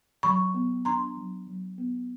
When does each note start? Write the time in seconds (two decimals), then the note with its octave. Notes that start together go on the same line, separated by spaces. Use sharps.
0.23 F#3 B5 C#6
0.54 B3
0.85 D4 A#5 C6
1.17 F#3
1.47 F#3
1.78 B3